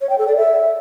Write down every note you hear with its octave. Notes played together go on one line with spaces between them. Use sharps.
C#5
G5
A4
D5
E5